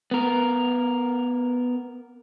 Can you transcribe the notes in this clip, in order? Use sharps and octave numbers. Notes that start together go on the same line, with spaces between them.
B3 A#4